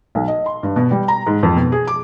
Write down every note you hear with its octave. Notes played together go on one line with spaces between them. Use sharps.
B1
D#5
C6
G2
B2
G3
A#5
G#2
F2
B2
G#4
D6